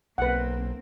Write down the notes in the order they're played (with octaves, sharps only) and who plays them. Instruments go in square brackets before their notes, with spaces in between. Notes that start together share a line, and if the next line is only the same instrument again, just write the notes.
[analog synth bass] B1 [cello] A#3 C4 [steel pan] B4 F#5